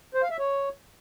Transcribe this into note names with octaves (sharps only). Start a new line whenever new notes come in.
C5
F5
E5
C#5